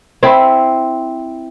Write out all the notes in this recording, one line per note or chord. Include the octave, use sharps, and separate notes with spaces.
C4 E4